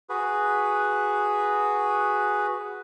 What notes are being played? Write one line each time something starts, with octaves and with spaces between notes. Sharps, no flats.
F#4 G#4 B4